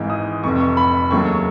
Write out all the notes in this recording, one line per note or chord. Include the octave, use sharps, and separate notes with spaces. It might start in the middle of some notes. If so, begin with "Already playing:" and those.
Already playing: G#1 G#2 E3
D#6
F1 F2 C3 C#6
C#6
B5
D#2 C#3 F#3 A3 C#6